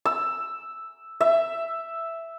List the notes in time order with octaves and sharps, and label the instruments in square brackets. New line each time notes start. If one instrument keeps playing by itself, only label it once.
[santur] E6
E5